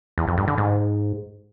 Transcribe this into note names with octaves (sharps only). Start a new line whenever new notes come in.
E2
F2
G2
D3
G#2